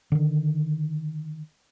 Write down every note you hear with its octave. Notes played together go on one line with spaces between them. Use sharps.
D3 D#3